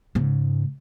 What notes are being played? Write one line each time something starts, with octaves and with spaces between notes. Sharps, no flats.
G#2 C#3